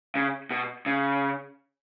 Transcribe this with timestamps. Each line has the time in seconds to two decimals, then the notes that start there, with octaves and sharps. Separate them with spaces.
0.15 C#3
0.51 B2
0.86 C#3